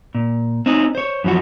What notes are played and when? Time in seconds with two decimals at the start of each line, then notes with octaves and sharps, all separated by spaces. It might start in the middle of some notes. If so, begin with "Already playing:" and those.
0.15 A#2
0.66 C4 C#4 D#4
0.95 C5 C#5
1.24 F#2 E3 F3 F#4